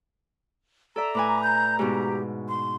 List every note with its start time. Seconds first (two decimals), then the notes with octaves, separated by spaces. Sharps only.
0.96 A4 D5 E5 A#5
1.15 A2 B4 G#5 D6
1.43 G6
1.79 G#2 B2 G4
2.49 C6